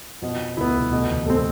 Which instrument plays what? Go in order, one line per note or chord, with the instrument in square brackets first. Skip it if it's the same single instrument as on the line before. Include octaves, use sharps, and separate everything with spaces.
[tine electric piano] F2 F3 [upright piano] B2
[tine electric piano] D2 D3 [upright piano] B3 E4
[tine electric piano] C2 C3
[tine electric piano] D2 D3 [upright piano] B2
[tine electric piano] E2 E3
[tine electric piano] A2 [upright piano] A3 C4